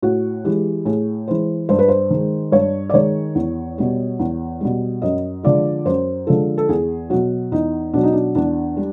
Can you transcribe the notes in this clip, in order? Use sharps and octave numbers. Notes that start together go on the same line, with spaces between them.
A2 F#4
E3 G#3 G4
A2 G#4
E3 G#3 C5
G2 C5
B4
C5
D#3 G#3
G2 C#5
D5
D#3 G#3 C#5
E2
B2 G3
E2
B2 G3
F#2 D#5
D3 F3 G#3 D5
F#2 C5
D3 F3 G#3 A4
A4
E2 G#4
B2 F#3 F#4
E2 D#4
B2 F#3 D4
D#4
D4
E2 D4
G3